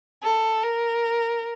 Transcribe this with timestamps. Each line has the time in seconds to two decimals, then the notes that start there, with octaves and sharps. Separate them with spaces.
0.23 A4
0.63 A#4